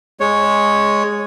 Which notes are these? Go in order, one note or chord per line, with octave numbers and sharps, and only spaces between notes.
G#3 C#5